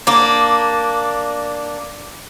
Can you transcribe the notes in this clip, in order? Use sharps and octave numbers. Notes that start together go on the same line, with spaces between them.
A#3 D4